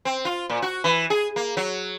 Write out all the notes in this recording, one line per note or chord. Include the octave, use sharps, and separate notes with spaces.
C4
F4
A#2
F#4
E3
G#4
A#3
F#3